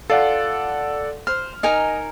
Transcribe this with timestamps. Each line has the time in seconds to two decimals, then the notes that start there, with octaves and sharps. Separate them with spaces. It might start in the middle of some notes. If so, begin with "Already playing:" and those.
0.10 F4 A4 D5 F#5
1.27 C5 F6
1.63 D#4 A#4 D#5 G#5